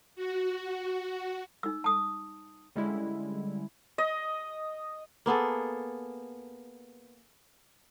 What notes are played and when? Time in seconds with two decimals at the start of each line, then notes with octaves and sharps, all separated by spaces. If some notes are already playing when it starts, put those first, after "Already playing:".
0.16 F#4
1.63 D#4 E6
1.84 A5 D#6
2.76 D3 G3 G#3 C#4 E4
3.98 D#5
5.26 A#3 B3 G#4 A4